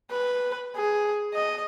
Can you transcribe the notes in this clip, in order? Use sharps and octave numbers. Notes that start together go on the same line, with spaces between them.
B4
G#4
D#5